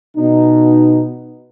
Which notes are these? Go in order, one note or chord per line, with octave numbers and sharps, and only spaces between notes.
B2 D#4